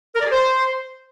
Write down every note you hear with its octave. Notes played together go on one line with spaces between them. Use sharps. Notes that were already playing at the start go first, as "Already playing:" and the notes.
A#4
D5
G#4
C5